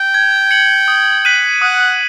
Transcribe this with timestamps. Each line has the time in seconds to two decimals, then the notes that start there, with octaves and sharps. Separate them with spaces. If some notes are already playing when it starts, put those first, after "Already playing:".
Already playing: G5
0.14 G#6
0.51 C#7 F#7
0.88 D#6
1.25 F#6 B6 D#7 F#7
1.62 F#5 D#6